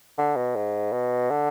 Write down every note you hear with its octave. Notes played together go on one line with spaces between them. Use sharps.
D3
B2
G#2
B2
D3